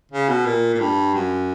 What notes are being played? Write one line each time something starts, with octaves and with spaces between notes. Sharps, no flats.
C#3
B2
A#2
A#2
G2
F#2